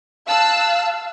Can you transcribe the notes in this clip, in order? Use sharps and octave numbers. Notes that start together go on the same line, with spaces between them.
F5 A5 E6 F#6